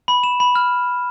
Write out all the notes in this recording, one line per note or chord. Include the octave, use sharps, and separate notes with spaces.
B5
E7
B5
F6